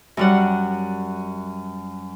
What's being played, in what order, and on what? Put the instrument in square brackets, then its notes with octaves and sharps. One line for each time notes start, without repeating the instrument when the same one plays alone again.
[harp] F#2 G3 F#5